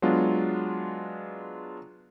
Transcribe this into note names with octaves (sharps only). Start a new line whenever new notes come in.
F#3 G#3 B3 D4 F4